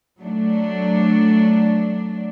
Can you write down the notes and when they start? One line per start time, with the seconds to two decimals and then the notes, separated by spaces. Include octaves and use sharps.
0.20 F#3 A3 D4